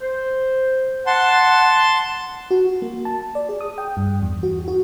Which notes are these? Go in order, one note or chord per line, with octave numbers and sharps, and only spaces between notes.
C5
F#5 A5 C6
F#4
A#3
A5
D5
G#4
D#6
G5
G2
E2
F#4
F#4